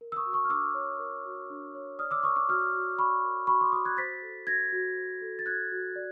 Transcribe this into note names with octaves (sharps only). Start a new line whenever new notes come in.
A#4
E6
C#6 D#6
F#4
C#6 D#6
F6
D4 D6 E6
C#5
A#4
F#4
D4
C#5
D5 D#6 F6
D6 E6
A#4 C#6 D#6
D6 E6
F#4 D#6 F6
F#4
D5 B5 C#6
A#4
F#4 B5 C#6
C6 D6
F#4 C#6 D#6
F#6 G#6
C5 A6 B6
A4
F#4 G#6 A#6
F#4
C5
A4
A6
F#4 F#6 G#6
F#4
D5